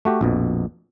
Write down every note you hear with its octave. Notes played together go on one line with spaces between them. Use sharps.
A3 F#4 G4
A#1 F2 B2